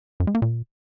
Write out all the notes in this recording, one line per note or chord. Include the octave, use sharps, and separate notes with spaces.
F#2
G#3
A#3
A#2